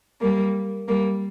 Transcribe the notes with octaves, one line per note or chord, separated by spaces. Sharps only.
G3 A#3
G3 A#3